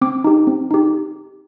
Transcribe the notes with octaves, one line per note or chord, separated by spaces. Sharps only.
C4 D6
D#4 G4
C4
D#4 G4